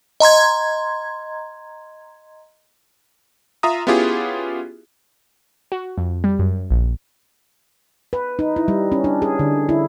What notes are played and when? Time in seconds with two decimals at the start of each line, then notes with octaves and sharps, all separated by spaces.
0.20 D#5 A#5 C6 G#6
3.63 F4 E5 A#5 D#6
3.87 B3 C#4 E4 F4 G4 G#4
5.72 F#4
5.98 F2
6.24 G3
6.39 F#2
6.71 A#1
8.13 B4
8.39 D#4
8.56 E4
8.68 G3
8.92 C#4
9.04 D4
9.22 G#4
9.39 D3
9.69 E4